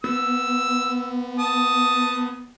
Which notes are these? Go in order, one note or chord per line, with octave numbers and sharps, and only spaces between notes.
B3 E6
A5 D#6